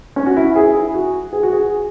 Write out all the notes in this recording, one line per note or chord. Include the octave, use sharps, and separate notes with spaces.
C#4
F#4
E4
G#4
E4
F#4
G#4
F#4
G#4